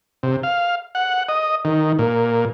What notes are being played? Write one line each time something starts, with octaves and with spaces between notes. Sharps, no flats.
C3
F5
F#5
D#5
D#3
A#2